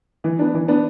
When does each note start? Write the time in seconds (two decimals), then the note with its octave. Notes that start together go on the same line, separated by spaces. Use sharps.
0.24 E3
0.39 B3 D4
0.54 E3
0.68 B3 D4